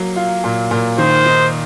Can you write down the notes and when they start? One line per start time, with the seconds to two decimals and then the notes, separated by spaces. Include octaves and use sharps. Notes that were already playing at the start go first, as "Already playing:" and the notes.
Already playing: F#3 A#3
0.16 F4
0.44 A#2
0.71 A#2
0.98 D#3 C5
1.26 D#4